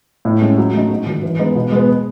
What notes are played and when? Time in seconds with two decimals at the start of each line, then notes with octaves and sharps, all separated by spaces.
0.25 A2
0.41 G#3 C#4
0.58 F#3
0.74 A3 D#4
0.90 G#2
1.06 D#3 F#3
1.23 E3
1.39 G#3 B3 D#4
1.55 B2
1.71 G#3 B3